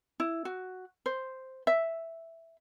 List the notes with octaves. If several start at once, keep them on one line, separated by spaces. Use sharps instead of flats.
E4
F#4
C5
E5